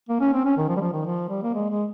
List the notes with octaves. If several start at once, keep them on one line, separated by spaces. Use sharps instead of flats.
A#3
C#4
C4
C#4
D#3
F3
G3
F3
D#3
F3
G3
A#3
G#3
G#3